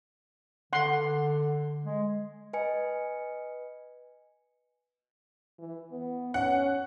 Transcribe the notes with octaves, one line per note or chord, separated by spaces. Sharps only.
D3 F#5 C6
G#3
B4 D#5 G#5 C#7
E3
B3
C#4 F#5